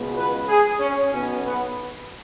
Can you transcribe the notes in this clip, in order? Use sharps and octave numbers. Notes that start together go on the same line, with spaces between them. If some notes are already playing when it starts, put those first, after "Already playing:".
Already playing: C#2 B2 B3
B4
G#4
C#4
B1 B2 B3 C#4
B3